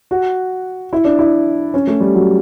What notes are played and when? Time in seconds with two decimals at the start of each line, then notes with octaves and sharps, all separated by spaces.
0.11 F#4
0.93 E4
1.05 D4
1.19 E4
1.74 C#4
1.87 A3
2.00 G3
2.15 F#3